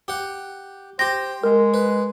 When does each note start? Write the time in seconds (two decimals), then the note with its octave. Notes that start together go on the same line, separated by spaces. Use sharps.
0.08 G4 F#5
0.99 G4 C5 G5 A#6
1.44 G#3 A#4
1.74 B4